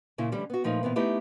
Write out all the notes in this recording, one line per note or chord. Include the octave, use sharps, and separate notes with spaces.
A#2 C#3 C#4 E4
D3 E3 G3 A3 C#4 E4
B3 F#4
A#2 F3 A3 D#4 B4
A#2 E3 B3 C4
A3 B3 D#4 E4 G4 B4